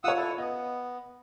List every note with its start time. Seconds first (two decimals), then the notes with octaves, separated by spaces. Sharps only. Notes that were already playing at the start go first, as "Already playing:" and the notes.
0.04 F4 C#5 F#5 D#6 E6
0.17 E4 A4
0.38 B3 D#5